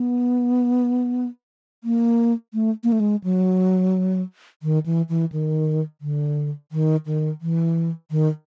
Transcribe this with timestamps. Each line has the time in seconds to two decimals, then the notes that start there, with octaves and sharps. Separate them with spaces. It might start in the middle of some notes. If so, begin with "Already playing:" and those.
Already playing: B3
1.84 A#3
2.54 A3
2.84 A#3
2.92 A3
3.00 G#3
3.24 F#3
4.63 D#3
4.86 E3
5.09 E3
5.32 D#3
6.01 D3
6.72 D#3
7.06 D#3
7.41 E3
8.11 D#3